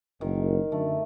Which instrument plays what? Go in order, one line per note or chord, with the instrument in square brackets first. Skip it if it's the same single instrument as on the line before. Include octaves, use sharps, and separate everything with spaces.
[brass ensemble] F#1 [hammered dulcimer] D#3
[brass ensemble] F#2 D3 [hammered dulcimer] A3